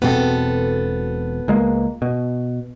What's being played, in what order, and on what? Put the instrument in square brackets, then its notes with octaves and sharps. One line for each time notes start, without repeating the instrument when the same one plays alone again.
[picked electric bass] E1 B2 C4 [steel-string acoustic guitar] B3 A4
[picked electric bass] C#2 G#3 A#3
B2